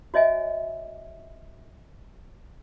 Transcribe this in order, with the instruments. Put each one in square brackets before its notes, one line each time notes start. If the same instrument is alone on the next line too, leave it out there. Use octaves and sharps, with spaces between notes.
[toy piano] F#4 C#5 D#5 E5 G#5